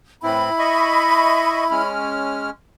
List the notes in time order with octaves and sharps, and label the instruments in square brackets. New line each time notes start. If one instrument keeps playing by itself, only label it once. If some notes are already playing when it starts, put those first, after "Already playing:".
[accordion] A2 E3 C4 [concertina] E4 [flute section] B5
[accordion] D#5 E5 C#6
G#3 C#4 F6